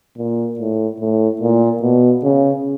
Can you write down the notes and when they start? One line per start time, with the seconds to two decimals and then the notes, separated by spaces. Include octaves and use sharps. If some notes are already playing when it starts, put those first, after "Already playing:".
0.17 A#2
0.59 A2
1.00 A2
1.41 A#2
1.82 B2
2.23 C#3